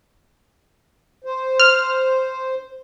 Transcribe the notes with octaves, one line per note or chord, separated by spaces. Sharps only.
C5
F6